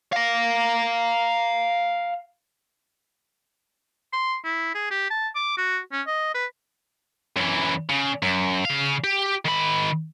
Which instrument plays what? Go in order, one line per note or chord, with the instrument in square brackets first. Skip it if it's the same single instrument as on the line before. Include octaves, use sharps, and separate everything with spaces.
[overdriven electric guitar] F5 A#5
[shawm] C6
E4
G#4
G4
A5
D6
F#4
C#4
D#5
B4
[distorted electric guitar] F#2 E3
C#3
F#2
C#3 F5
G4
D#3 B5